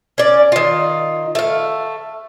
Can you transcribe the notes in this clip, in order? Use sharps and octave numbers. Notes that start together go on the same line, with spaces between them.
C#4 D5
D#3 F4
A3 F5